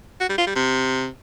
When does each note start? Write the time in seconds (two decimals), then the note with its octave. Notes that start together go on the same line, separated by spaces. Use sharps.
0.21 F#4
0.29 G3
0.38 F4
0.47 G3
0.56 C3